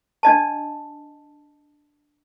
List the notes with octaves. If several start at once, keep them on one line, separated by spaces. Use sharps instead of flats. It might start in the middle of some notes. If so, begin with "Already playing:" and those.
D4 D#5 A5